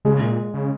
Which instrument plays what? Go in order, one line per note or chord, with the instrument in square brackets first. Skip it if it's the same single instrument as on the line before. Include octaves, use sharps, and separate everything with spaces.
[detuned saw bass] C#3 [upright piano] G#3
[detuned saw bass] A#2
C#3